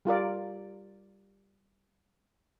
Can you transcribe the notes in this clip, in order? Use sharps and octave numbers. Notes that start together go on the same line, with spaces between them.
G3 F4 A#4 D5